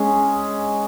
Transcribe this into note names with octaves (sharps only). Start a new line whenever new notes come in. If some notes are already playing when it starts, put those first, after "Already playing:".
Already playing: G#3 C#4 G#4